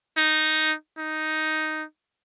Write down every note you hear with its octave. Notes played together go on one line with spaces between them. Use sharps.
D#4
D#4